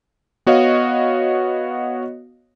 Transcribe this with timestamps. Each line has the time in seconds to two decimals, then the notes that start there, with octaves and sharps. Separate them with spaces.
0.46 B3 F#4 C#5 D#5 F5